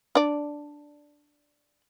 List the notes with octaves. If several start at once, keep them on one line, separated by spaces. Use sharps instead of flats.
D4 D5